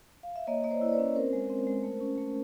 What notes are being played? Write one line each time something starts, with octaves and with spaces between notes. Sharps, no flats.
F5
E5
A#3 C#5 D#5
A#3 D#5
C5 D5
E4
D5
B4 C#5
C#4
C4 A#4 C5
G#3
C4
G#3
A3
C#4
A3